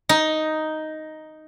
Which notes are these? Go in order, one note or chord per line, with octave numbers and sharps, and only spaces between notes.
D#4